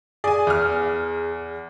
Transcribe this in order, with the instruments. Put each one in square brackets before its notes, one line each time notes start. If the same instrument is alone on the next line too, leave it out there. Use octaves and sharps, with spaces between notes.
[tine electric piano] G#4 [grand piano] D5 G#5
[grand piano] E2 F6